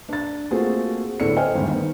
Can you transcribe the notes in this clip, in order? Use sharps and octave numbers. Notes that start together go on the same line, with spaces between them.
D4 A6
A3 A#3 C4 F4 F#4 G#4
D2 A2 B3 A4 D5 C#7
C5 D#5 G5 G#5 F6
G1 D#2 G#2
D#3 B3 D#4